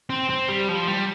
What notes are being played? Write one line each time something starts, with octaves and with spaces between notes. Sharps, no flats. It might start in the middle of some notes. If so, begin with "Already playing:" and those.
C4
C4
G3
F3
G3